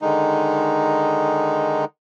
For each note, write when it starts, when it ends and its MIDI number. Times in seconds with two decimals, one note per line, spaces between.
0.02 1.85 50
0.02 1.85 51
0.02 1.85 56
0.02 1.85 63